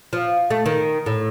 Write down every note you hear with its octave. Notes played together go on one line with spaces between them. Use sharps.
F3
A3
D#3
A2